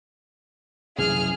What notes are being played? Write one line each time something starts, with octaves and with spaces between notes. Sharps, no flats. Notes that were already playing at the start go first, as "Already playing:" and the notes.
C2 F#2 E3 G#4 F6